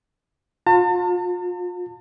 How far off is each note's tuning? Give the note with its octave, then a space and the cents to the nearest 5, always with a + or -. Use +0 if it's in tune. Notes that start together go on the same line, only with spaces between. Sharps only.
F4 +35 A5 +40